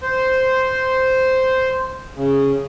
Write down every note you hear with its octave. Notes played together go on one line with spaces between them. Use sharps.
C5
C#3